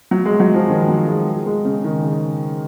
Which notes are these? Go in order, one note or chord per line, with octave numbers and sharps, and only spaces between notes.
F#3
G#3
F#3
F3
D#3
F#3
G#3
G#3
C#3
D#3
C#3